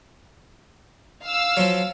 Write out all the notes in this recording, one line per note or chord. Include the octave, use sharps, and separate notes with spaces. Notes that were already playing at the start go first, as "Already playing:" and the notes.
F5 E6
F3 F#3